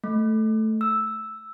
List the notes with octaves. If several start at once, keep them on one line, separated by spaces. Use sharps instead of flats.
A3
E6